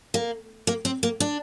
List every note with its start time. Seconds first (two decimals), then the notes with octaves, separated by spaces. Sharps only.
0.14 A#3
0.67 A#3
0.85 C4
1.03 A#3
1.20 D4